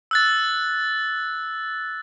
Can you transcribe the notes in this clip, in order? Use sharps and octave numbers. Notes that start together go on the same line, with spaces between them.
E6 F#6 A6